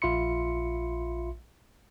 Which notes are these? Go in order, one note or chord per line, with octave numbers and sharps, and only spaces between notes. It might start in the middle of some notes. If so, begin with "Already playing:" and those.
A#1 F4 E5 B5 C6 C#7